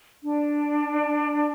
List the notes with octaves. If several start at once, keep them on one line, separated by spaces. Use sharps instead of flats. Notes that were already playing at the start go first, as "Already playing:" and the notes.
D4